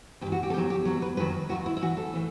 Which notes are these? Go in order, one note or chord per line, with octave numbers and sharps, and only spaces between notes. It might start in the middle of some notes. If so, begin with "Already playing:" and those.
G2 E3 G4
F#4
G4
A4
E2 D#3 F#3 G4
G4
E2 B2 F#3
B4
F#2 D#3 F#3 B4
D#2 D#3 F#3 F#4
E4
E4
G2 E3 F#4
A4
A2 E3